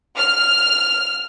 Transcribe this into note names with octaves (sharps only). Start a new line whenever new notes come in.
F6